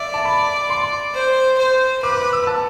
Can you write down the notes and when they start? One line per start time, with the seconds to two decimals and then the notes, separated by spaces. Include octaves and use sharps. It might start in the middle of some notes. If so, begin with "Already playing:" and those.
Already playing: D5 E5
0.14 A5
0.25 B5
0.70 C6
1.14 C5
1.58 C5
2.03 B4 D6
2.17 D6
2.33 E6
2.47 A5